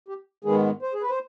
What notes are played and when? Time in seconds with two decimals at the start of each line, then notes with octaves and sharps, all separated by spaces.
0.08 G4
0.44 G#2 D#3 G#3 B3 G#4
0.82 C5
0.93 G#4
1.02 B4
1.10 C5